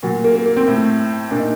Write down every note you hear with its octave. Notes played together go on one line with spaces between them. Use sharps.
A#2 F#3
A#3
A#3
A#3
C4
A2
A#2 D4
D#4